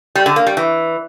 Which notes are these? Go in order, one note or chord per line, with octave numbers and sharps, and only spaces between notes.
G3
D3
A#3
G3
E3